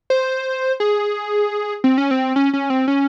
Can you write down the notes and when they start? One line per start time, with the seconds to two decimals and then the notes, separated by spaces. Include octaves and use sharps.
0.10 C5
0.80 G#4
1.84 C4
1.98 C#4
2.11 C4
2.36 C#4
2.53 C#4
2.70 C4
2.88 C#4